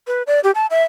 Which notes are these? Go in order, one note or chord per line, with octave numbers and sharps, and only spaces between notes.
B4
D5
G4
A5
E5